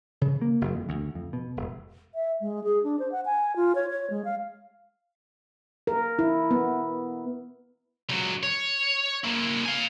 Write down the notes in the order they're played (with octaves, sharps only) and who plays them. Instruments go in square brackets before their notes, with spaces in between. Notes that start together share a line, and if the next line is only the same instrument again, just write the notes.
[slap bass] C#3
A#3
F#1
F2
D2
F2
B2
E1
[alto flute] E5
G#3
G#4
D4
C5
F#5
G#5
F4
C#5
C#5
G#3
F5
[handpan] A#4
E4
B3
[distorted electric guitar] C#2 F#3
C#5
A#3 E4
F5 G#5